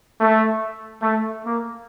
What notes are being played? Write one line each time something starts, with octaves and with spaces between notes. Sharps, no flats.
A3
A3
A#3